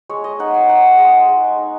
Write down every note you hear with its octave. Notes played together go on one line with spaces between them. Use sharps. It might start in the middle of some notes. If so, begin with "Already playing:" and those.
G#3 C#5
D#5
D#4 F#5
G#5
D#4 F#5
G#3
G#3
D#4